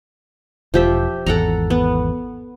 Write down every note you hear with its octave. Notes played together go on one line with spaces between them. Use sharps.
E1 F3 G4 E5
G#1 E2 A4 F#5 A#5
B3